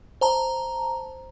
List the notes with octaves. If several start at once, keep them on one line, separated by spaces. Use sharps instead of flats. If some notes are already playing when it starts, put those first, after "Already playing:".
C5 A5 A#5